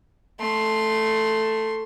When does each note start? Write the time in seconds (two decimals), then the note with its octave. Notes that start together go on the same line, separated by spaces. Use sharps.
0.40 A3 C6